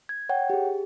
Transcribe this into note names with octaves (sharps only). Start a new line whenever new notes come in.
G#6
C#5 F#5 G5
G4 G#4